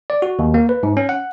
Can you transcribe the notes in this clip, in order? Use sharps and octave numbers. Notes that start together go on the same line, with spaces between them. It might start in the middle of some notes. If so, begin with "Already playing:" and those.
D5
F#4
D#2
A#3
B4
G#2
C#4
F#5